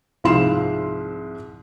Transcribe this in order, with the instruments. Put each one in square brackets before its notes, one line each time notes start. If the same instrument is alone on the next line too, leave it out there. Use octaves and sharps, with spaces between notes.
[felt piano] C2 G#2 F3 F5 C6 E7